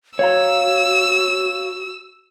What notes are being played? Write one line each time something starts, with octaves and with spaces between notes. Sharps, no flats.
F#4 C#5 F5 A#5 E6